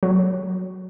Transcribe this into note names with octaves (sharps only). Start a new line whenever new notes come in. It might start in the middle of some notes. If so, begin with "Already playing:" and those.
F#3